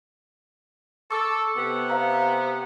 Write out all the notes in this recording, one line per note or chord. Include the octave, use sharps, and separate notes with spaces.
A4 C#6 D6 E6
C3 B3
C5 F5 A#5